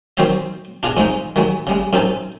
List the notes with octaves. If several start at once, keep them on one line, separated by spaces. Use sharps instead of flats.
D#3 F#3 C4 C5 C#5 D#5
D4 F4 G#4 D#5 G#5
F2 G#2 G#3 D#4
D#3 F#3 G#3
C#3 G3 G#3
F#2 C4 D#4 A4 G#5